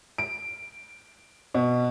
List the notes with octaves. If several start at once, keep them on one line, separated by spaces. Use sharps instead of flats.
D7
B2